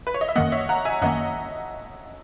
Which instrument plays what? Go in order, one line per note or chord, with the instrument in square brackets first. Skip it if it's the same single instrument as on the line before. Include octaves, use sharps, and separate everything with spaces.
[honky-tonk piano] B4
C#5
D#5
E5
[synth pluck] F#2 D#3 A#3 [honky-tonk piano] D#5 F#5
[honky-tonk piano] C#5 E5
F#5 A#5
E5 G#5
[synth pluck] F#2 D#3 A#3 [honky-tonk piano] D#5 F#5